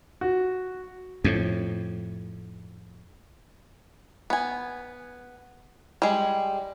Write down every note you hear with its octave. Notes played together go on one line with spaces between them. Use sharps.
F#4
F2 A2
B3 G#5
G3 G#3